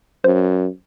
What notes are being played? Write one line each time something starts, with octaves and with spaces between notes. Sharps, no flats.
F#2 C5